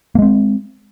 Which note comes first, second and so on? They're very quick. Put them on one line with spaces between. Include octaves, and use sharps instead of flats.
A#3 G#3 C4